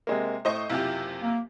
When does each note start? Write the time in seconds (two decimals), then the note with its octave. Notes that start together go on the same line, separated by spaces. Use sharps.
0.07 C3 G#3 A#3
0.45 A2 C5 D#5 C#6
0.70 F#1 C3 E4 F4 G4
1.22 A#3